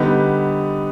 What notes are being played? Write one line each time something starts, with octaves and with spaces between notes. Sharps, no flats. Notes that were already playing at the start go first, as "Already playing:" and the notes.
Already playing: D3 G3 B3 D#4